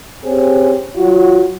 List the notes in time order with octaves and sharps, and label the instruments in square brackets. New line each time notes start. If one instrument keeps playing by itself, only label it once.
[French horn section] C4 C#4 G4 G#4 C5
F#3 F4 F#4